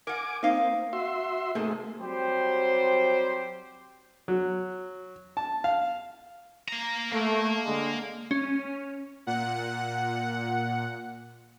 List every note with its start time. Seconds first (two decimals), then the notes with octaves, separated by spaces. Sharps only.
0.07 A#4 F#5 G#5 D6
0.43 A#3 C4 D#4 F5
0.93 F#4 E5 C6
1.55 G#2 C3 A3 A#3 G#4 A5
2.00 F#3 G3 C4 G4 C5
4.28 F#3
5.37 A5
5.64 F5
6.68 A#3 A#5
7.12 A3 A#3
7.65 D3 G#3
8.31 C#4
9.27 A#2 F#5